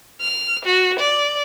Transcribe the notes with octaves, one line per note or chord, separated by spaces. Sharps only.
F6
F#4
D5